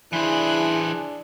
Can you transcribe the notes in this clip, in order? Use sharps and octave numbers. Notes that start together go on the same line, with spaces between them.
E3 D4 E4 G#4 C5 F#6